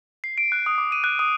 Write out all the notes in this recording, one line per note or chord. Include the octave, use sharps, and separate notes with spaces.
C7
D7
F#6
D#6
D6
D#7
F#6
D#6